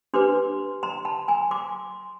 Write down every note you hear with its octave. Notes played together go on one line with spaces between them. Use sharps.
D4 G4 B4 C6 D6
A#5 C6
A5 B5
G#5 A#5
C6 D6